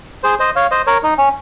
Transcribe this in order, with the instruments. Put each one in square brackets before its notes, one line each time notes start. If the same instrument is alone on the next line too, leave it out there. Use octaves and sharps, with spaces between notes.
[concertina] G#4 C5
C5 D#5
C#5 F5
C5 D#5
A#4 C#5
D#4
C#4